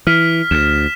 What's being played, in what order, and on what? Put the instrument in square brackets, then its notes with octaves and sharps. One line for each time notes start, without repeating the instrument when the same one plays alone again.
[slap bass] E3 [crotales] F6 B6
[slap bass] D2 [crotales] E7